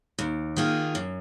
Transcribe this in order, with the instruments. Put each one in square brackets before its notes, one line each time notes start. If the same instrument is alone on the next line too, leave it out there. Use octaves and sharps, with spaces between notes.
[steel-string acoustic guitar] D#2
D#3 A#3 F4 G#4
F#2